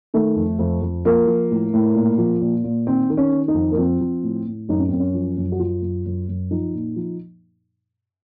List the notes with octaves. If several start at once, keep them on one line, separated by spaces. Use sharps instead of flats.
D#3 A3
F2
F2
F2
F3 A#3
F3
A2
A2
A#2
F3
A#2
A#2
D#3 C4
D#3
C#4
D#3
D#4
F2
A#3
F3 C4
F3
A2
A2
F#2 D#4
C#4
F#2 C4
C#4
F3
F#2
F#4
F#2 F4
F#2
F#2
F#2
F3 D#4
A#2
F3